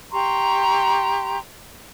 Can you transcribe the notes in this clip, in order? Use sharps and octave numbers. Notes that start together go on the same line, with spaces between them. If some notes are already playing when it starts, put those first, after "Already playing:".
G4 A#5 C6 C#6